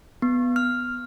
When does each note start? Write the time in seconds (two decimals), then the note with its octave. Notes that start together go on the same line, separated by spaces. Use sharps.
0.22 B3
0.56 F6